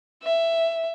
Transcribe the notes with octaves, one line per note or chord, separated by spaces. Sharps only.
E5